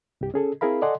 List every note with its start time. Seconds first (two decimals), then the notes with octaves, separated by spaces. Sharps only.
0.21 C2 G2 G4
0.34 C#4 G#4 A4
0.61 C4 E4 G#4 A#4 F5 B5
0.82 A4 D5 D#5 F#5 G#5 C6